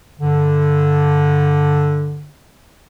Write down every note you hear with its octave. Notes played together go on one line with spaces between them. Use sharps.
G2 D3